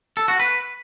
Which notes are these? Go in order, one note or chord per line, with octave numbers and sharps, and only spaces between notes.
A4
F#4
B4